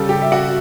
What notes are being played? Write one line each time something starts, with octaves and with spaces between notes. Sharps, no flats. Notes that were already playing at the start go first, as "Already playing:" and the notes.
Already playing: C#3 G3 A4
G4
E5
F#4 F#5